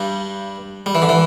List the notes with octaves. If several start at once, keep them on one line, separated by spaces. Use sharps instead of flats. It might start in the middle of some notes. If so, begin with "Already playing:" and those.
Already playing: G2 G3
G3
E3
D3
E3